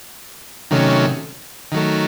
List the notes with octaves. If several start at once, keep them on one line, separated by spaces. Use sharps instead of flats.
C3 D#3 F#3 A3 C#4
D#3 F#3 A3